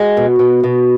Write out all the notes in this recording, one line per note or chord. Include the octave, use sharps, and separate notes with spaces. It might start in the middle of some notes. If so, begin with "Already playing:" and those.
Already playing: G#3 F#4
B2
B2
B2